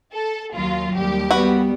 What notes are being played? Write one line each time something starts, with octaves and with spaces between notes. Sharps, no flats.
A4
D#2 F#3 F4
D#2 G3 G4
G3 B3 F#4 B4